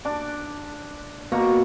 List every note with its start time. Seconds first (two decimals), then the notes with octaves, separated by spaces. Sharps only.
0.05 D4 D6
1.32 B2 A#3 A#5 C#6